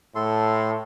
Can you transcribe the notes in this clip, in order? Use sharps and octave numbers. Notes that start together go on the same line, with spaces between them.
A2 A4 C6